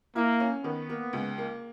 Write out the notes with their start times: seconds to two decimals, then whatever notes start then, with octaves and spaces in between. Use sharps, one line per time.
0.16 A#3 E4
0.40 C#4
0.64 D#3 B3
0.89 A#3
1.13 C#2
1.38 A#3